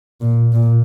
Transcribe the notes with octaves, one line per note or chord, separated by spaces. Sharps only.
A#2
A#2